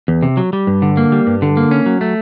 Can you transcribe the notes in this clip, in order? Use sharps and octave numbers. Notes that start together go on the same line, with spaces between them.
E2
C3
F#3
G3
G2
D3
A#3
G3
G2
D3
A#3
C#4
F#3
A3